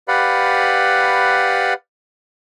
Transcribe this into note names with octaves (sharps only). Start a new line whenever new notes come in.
G4 B4 D5 F5 F#5 B5